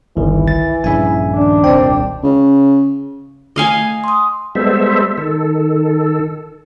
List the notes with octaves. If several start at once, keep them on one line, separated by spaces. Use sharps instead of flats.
G1 C2 D#3 E3
A6
A#1 G2 C#3 E5 G#5
D#3 D4
D#1 C2 C4 D5 G5
C#3
A3 D#5 F5 G#5
C6 D#6
G3 G#3 B3 A4 C5 E5
D#3 A4